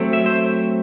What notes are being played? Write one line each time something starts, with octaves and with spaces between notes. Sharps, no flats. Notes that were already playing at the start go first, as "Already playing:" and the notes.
Already playing: F#3 A3 C4
E5
C5